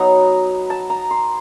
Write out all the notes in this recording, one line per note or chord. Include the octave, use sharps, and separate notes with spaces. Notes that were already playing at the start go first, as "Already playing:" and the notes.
Already playing: F#3 B3 D#4 A#5
A5
A#5
C6